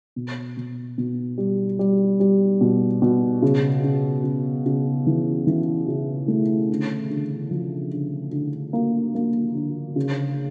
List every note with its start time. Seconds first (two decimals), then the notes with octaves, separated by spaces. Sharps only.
0.16 B2
0.57 B2
0.98 B2
1.38 G3
1.79 G3
2.20 G3
2.61 B2
3.02 B2
3.42 C#3
3.84 C#3
4.24 C#3
4.66 C#3
5.07 E3
5.47 E3
5.88 C#3
6.28 A3
6.69 D3
7.10 D3
7.51 F3
7.92 D3
8.32 D3
8.73 A#3
9.15 A#3
9.55 D3
9.96 C#3